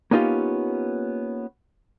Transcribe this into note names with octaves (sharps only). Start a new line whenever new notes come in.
A#3 B3 C#4 D#4 F4 G4